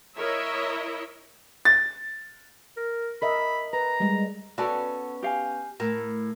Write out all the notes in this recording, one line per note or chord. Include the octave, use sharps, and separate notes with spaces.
E4 A#4 C#5 D#5 E5
A6
A#4
A#4 D#5 E5 B5
B4 A#5
G3 G#3
B3 C#4 F#4 A4 D5
G4 F5 G#5
A2 A#4